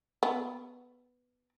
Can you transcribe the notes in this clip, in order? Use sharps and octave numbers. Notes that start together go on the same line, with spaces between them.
B3